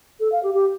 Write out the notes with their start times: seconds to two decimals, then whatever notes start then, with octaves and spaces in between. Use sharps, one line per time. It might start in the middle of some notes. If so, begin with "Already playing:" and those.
0.19 A4
0.31 F5
0.43 G4
0.54 G4